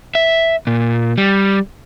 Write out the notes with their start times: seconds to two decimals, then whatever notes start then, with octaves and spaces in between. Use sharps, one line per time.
0.15 E5
0.67 A#2
1.18 G3